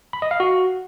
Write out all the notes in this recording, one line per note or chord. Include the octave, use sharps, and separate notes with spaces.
B5
D#5
F5
F#4